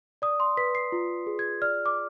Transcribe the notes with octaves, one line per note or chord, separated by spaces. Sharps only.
D5 D#6
C6
B4 B6
C7
F4
G#4
G#6
D5 F6
D6